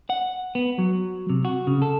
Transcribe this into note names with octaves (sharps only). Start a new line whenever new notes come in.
F#5
B3
F#3
C3
F#4
C#3
A4